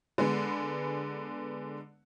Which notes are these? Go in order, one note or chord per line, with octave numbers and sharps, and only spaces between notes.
D3 G#3 B3